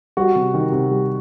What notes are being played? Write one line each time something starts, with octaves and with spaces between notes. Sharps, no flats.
G3 F#4
C3
D#3
C3
G3